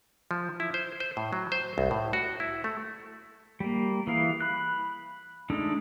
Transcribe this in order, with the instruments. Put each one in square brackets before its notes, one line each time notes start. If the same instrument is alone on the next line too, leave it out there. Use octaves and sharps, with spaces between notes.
[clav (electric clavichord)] F3
E4
C5
C5
A2
F#3
C5
C2
A2
F#4
E4
A3
[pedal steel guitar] G3 A#3
E3 G#4 F5
B5 F#6
G#3 A3 D4 D#4 A4